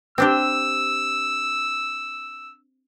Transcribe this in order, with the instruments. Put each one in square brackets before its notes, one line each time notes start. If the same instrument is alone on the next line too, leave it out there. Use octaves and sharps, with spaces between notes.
[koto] C4 D4 G4 [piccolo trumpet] E6